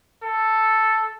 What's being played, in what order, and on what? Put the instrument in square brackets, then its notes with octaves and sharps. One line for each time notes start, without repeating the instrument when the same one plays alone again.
[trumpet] A4